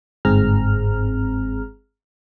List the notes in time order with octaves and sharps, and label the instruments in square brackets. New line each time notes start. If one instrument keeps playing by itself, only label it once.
[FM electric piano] G1 G#2 C4 G#4 A#5 F6